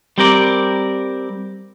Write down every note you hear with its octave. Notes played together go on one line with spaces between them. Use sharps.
G3 C4 G4 A#4 D5